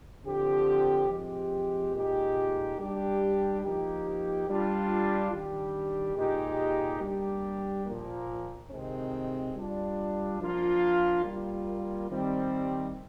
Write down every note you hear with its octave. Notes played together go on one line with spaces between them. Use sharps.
D3 F3 C4 G4
F3 G#3 C4 G4
A#2 G#3 D#4 G4
G3 D4 G4
F3 A#3 D#4 G4
G3 D4 F4
D#3 G3 D4 G4
A#2 G#3 D#4 G4
G3 A#3 D4 G4
A#2 F3 A#3
C3 D#3 G#3 C4
G3 D4 F4
F3 A#3 D4 F4
G3 A#3 F4
D#3 G3 C4